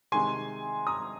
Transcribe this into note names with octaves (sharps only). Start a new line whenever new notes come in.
C3 D#3 G#3 D#4 G#5 C6
A#5 D#6